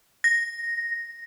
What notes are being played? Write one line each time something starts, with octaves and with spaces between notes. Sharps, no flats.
A#6